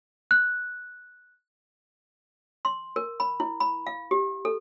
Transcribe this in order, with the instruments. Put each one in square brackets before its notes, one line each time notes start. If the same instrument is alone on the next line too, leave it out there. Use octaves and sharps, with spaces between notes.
[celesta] F#6
[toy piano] C6
A#4
B5
E4
B5
F5
G4
A4